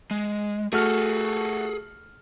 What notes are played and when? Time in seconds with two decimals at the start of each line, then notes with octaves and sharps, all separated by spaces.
0.11 G#3
0.73 A3 F#4 G#4 A4 F6